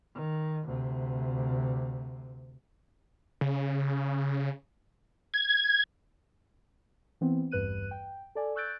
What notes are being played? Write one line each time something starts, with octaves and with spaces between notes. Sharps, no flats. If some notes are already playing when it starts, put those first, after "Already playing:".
D#3
D2 C3
C#3
G#6
E3 B3 C4
A1 E2 G2 B4 F#6 D#7
G5
A4 D5 G#5
C#6 E6 F#6 G6 A6 D7